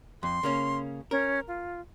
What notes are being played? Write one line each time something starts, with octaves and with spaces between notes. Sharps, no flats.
F2 C6
C#3 A#3 C#4
C#4 A#4
F4